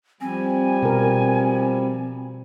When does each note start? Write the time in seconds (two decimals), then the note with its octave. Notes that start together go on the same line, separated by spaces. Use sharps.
0.21 F3 G3 C4 G#5
0.82 B2 A#4